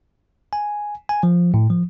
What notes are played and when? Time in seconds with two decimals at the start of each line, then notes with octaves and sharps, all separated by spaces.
0.53 G#5
1.09 G#5
1.23 F3
1.54 A2
1.70 F3